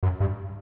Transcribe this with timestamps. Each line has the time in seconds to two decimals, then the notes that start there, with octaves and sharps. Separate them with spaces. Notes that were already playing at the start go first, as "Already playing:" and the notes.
0.03 F#2
0.20 G2